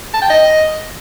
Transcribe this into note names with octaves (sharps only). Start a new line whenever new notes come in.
A5
G5
D#5